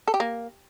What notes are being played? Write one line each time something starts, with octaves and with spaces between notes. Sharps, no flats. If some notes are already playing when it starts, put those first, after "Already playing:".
A4
G4
A#3